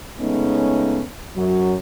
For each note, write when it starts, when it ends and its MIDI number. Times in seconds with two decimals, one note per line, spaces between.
0.20 1.02 49
0.20 1.02 56
0.20 1.02 57
0.20 1.02 59
0.20 1.02 61
0.20 1.02 63
1.37 1.75 42
1.37 1.75 54